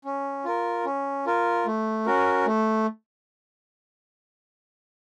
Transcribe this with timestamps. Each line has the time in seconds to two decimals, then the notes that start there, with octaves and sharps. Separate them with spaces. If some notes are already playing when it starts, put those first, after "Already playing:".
0.05 C#4
0.45 F4 A#4
0.85 C#4
1.26 F4 A#4
1.66 A3
2.06 C#4 F#4 A#4
2.46 A3